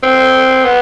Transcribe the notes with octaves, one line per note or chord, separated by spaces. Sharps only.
C4
B3